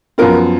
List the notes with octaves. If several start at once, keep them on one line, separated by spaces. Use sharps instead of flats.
F#2 F3 B3 F4 A#4